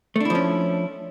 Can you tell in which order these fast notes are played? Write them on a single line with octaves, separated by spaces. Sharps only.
A3 D4 E4 F3 C#4